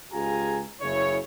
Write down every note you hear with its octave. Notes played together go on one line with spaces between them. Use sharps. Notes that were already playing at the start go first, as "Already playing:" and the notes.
C#2 F4 G4 G#4 G#5 A#5
F#1 C#3 E4 C#5